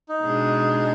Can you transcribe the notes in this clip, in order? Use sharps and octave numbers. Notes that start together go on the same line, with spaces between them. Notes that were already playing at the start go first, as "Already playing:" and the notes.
D#4
B2 G#3 D4 G#4